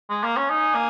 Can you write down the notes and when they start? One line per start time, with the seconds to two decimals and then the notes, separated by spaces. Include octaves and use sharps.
0.09 G#3
0.24 A#3
0.37 C#4
0.49 D#4 G#5
0.75 A#3